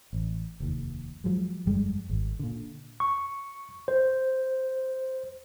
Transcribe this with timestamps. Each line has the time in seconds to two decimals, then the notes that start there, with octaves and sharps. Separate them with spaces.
0.13 A1
0.60 F1 D#2
1.24 F3 F#3 G#3
1.66 G1 F2 G3 G#3
2.09 G#1
2.39 A#2 D3
3.00 C#6
3.88 C5